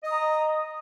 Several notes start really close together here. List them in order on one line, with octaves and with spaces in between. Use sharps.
D#5 D#6 A#5